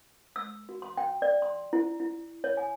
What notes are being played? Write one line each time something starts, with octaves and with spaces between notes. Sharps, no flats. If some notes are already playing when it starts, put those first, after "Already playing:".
E6
F#4
C6
G5
D5
C6
E4
E4
C#5
G#5